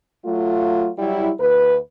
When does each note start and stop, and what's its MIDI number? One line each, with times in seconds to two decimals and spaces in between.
0.24 0.89 54
0.24 0.89 57
0.24 0.89 65
0.98 1.31 54
0.98 1.31 55
0.98 1.31 64
1.39 1.77 38
1.39 1.77 71